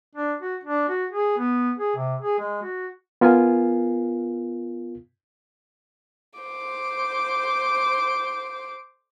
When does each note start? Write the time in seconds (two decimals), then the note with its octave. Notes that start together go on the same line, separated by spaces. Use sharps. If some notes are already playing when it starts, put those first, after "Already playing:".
0.15 D4
0.41 F#4
0.64 D4
0.89 F#4
1.10 G#4
1.38 B3
1.78 G#4
1.96 C3
2.21 G#4
2.39 G#3
2.63 F#4
3.21 B3 F4 A#4 G#5
6.39 C5 D6